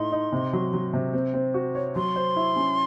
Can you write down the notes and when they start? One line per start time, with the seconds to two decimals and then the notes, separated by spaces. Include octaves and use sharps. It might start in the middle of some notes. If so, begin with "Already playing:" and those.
Already playing: A2 D#4 C6
0.12 D#4
0.32 C3
0.53 F#3
0.73 F#3
0.93 C3
1.13 C4
1.34 C4
1.54 F#4
1.75 C#5
1.96 F#3 C6
2.16 C5
2.36 E4
2.56 C#4